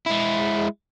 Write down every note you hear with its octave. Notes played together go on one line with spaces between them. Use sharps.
G#3 E4